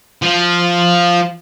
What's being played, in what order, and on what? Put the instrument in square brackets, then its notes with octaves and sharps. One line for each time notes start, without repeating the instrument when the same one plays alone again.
[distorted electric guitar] F3